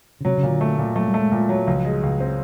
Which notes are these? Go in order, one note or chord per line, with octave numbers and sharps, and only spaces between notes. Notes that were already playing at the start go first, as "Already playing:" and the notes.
C#3
C3 F#3
C#3
A#2
D3
A3
A#2
F#3 A3
G3
A3
G#3
A#2
F#3
C#2 F3
G#3
C#2
C4